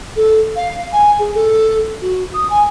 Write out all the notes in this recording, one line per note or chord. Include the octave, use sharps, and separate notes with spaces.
A4
F5
G#5
G#4
A4
F#4
D#6
G#5